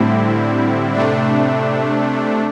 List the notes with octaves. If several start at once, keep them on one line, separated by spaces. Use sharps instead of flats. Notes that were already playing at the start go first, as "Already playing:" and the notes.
Already playing: A2 D3 G3 C4 E4
C3 A3 D4